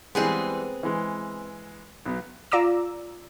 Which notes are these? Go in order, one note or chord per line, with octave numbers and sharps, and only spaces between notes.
E3 G3 G#3 B3 C4 G#4
E3 G#3
B1 B3
F4 D5 A#5 D6 E6